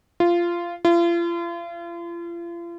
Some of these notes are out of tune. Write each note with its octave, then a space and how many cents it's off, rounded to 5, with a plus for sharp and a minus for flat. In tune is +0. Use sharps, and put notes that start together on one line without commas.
F4 -15
F4 -40